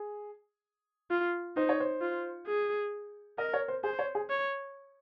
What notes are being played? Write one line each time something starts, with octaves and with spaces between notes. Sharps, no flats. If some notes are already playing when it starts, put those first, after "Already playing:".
Already playing: G#4
F4
D#4 C5
C#5
C5
F4
G#4
A#4 D#5
C#5
C5
G#4 C5
C#5
G#4
C#5